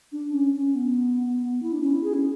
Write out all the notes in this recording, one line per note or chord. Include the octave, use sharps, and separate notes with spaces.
D4
C#4
C#4
B3
E4
D4
C#4
E4
G#4
C#4